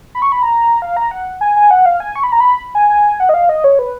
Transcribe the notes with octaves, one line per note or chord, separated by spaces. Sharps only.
B5
C#6
B5
A#5
F5
A#5
F#5
G#5
G#5
F#5
F5
G#5
C#6
B5
A#5
B5
G#5
G#5
F#5
D#5
F5
D#5
C#5
B4